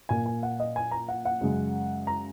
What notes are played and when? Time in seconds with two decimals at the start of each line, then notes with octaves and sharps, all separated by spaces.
0.09 A#2 A#3 G#5
0.26 G#5
0.43 F#5
0.60 D#5
0.76 G#5
0.91 A#5
1.08 F#5
1.25 F#5
1.41 F#2 C#3 G#3
2.07 A#5